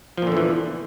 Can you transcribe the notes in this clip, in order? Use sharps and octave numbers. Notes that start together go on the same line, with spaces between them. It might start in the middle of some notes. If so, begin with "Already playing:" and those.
E2 A#2 D3 E3 F3